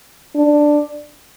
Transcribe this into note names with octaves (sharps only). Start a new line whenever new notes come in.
D4